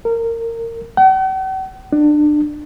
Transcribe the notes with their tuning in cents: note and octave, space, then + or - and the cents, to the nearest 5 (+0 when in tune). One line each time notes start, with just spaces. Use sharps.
A#4 -20
F#5 +45
D4 +25